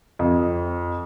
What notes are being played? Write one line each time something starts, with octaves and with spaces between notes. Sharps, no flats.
F2